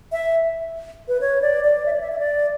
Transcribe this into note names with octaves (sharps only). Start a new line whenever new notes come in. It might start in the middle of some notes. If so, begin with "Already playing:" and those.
E5
B4
C#5
D5
D5
E5
D5
E5
E5
D5